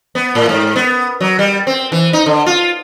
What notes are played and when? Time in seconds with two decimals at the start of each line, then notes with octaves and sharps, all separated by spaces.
0.15 B3
0.35 A2
0.49 G#2
0.76 B3
1.21 F#3
1.39 G3
1.67 C4
1.92 E3
2.13 D#4
2.26 D3
2.46 F4